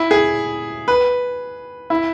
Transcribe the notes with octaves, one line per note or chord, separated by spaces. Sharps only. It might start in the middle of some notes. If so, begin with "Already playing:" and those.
Already playing: E4
G#4
B4
E4